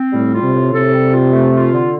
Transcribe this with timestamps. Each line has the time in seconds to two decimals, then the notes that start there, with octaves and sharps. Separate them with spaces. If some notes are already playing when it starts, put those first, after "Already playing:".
Already playing: C4
0.13 A2 G3
0.33 F4
0.43 C3
0.53 A2
0.73 C3 A4
0.93 G3
1.14 F4
1.33 A3
1.53 F4
1.73 D3